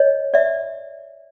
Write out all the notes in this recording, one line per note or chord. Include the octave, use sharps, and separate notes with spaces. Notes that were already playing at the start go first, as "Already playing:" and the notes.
Already playing: C#5 D#5
D5 E5